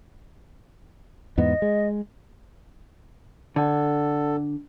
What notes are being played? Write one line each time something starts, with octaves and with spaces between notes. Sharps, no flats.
E2 G#2 B3 D#5
G#3
D3 A4 D5 F#5